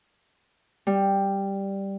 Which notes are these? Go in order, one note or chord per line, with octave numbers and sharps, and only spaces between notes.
G3